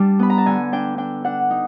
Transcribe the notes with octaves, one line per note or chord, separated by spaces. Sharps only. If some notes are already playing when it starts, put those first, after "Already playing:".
Already playing: G3 D4 A5
B3 B5
A#5
A5
D3 G#5
D4 G5
D4 G5
D4 F#5
D#4